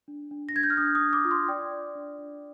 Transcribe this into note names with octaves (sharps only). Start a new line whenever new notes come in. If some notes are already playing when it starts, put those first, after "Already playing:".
D4
D4
A#6
D4 G#6
G6
F6
D4 D#6
D#6
D4
D6
F4
C6
D5 G5
D5
D4
D4